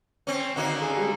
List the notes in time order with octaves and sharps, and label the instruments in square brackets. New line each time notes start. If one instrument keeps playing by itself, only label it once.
[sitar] C4 C#4
[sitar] D3 D#3 A#3 [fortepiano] F#4
[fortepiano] G#4 G#5
G3 G#3